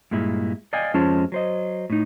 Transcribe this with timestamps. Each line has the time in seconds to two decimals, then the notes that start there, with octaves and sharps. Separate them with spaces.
0.11 G2 A#2 G#3 E4
0.73 D5 D#5 F5 G5 G#5
0.94 F2 G#3 C#4 F4 C5 A5
1.32 F#3 C5 D#5
1.90 A2 D#4